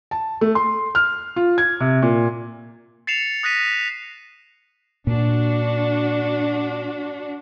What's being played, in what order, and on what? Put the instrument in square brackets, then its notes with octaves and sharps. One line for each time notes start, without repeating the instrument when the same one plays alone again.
[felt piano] A5
A3
C6
F6
F4
G#6
C3
A#2
[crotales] A6 C7 C#7 E7 F7
D#6 F#6 A#6 B6 D#7
[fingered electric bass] A#2 [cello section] D4 F#4